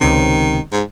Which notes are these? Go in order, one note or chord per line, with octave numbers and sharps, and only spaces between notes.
C#2 C3 D#3
G#2